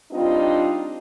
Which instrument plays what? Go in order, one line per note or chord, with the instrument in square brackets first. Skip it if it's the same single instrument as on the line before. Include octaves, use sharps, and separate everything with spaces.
[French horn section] G3 C4 D4 D#4 F4